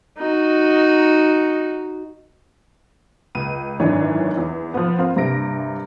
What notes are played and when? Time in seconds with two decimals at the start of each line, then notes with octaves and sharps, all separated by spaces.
0.18 D#4 F#4
3.35 C#2 D#7
3.80 G#1 F#2 D#3 E3 D4 C#5
4.37 E2
4.74 F3 B3
4.98 A#3 C4 F4
5.16 G2 C3 A#3 A#6 D7